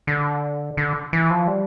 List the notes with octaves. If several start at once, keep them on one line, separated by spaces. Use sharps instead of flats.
D3
D3
E3
F3
G3